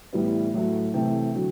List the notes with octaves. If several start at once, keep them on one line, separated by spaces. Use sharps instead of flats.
A2 E3 G3 B3
A2 F#3 A3
C3 E3 A3 G5
D3 F#3